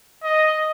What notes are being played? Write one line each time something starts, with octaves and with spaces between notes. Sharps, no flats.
D#5